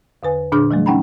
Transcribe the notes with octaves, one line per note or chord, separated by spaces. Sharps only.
E2 D3 B4 G#5
A#2 D3 D4 G#4 D6 F6
E3 F#3 G3 A3
C#4 D#4 F#5 G5 A#5 B5